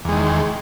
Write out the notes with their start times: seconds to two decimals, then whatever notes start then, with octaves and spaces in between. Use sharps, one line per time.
0.05 E2
0.09 G#3
0.12 D#3